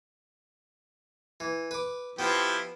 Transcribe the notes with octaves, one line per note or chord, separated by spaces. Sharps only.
E3
B4 D6
F3 B3 E4 G4